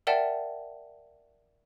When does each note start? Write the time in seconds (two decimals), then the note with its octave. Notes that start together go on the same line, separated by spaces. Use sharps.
0.07 A#4 D5 E5 F#5 G5 A5